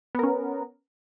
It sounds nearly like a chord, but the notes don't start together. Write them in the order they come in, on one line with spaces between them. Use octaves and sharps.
B3 A#4 C#4